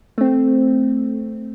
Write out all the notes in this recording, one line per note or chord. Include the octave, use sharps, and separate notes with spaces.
A3 C4